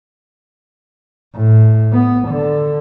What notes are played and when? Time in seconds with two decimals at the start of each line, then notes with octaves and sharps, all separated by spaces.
1.35 A2
1.93 B3
2.28 D3